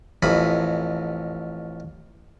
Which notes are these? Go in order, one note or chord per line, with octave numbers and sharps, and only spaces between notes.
A1 F2 B5